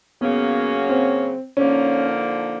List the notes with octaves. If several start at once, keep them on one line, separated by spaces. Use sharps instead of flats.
C#3 F#3 A#3 B3 C#4 F#4
C4
D3 F3 A#3 C#4 D#4